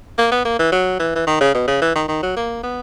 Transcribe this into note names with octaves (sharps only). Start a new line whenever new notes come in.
A#3
B3
A#3
E3
F#3
E3
E3
D#3
C#3
B2
C#3
E3
D#3
D#3
F#3
A#3
B3